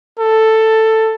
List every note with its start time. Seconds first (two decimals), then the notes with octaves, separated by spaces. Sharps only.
0.19 A4